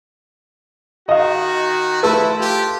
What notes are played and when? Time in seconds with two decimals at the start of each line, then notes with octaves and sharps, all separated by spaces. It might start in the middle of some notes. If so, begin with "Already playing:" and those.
1.09 D#3 F#4 D#5 F5
2.03 F3 A3 E4 A4 B4
2.39 F4 G4